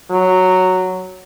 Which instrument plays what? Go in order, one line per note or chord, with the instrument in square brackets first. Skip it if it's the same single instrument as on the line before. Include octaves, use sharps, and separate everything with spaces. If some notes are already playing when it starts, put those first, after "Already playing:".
[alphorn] F#3